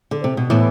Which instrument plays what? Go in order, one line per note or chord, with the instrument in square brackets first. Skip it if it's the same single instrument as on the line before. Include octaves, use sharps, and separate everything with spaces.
[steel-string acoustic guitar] D3
C3
B2
[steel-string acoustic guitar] A2 [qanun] E3 B3 E4